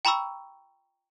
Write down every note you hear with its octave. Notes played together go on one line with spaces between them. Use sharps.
G5 A#5 B5 C#6 E6